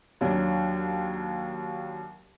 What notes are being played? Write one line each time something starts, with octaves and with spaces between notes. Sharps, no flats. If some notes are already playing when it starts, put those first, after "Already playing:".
D#2 F#3 D4